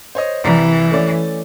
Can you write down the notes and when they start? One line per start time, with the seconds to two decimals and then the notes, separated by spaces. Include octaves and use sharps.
0.15 C5 C#5 D#5
0.44 C2 E3 D5 A#5
0.91 A3 C#4 D5